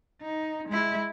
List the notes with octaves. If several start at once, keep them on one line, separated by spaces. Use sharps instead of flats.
D#4
G#3 E4